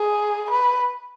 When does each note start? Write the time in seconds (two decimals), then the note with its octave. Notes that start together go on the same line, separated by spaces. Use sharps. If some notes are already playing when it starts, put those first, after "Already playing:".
Already playing: G#4
0.51 B4